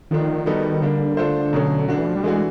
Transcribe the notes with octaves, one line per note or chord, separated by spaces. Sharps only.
D3 D#3 F3 A3 D4
G3 B3 D#4 F#4 A4
D3 G3 A#3 D4
A3 D4 F4 A4 C5
B2 F#3 A3 C#4
D3 A3 D4 F#4
E3
F3
G3
E3 G#3 A3 D4 F#4